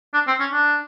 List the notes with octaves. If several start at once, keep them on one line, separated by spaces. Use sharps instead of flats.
D4
C4
C#4
D4